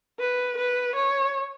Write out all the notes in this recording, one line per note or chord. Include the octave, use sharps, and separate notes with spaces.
B4
B4
C#5